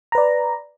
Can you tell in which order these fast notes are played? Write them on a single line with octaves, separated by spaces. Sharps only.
A#5 B4 D5